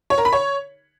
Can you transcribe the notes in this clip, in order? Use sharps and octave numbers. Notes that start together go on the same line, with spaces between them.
C#5
A#4
B5
C#5